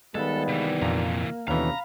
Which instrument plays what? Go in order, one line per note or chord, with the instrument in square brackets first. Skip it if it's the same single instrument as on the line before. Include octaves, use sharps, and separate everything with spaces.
[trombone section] D#3 G3 B3 [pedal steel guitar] G#3 F4 B4 [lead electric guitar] A4
[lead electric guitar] C3 E3
[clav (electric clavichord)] F2 A#2 A#5 [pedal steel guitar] A#3
[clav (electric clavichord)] D#2 E3 [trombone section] B2 D3 C#4 [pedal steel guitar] F5 B5 [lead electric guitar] A#5